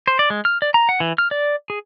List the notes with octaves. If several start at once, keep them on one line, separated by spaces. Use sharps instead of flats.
C5
D5
G#3
F6
D5
A#5
F#5
E3
F6
D5
G#4